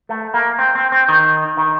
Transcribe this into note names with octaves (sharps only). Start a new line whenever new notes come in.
A3
A#3
C4
C4
C4
D#3
D#3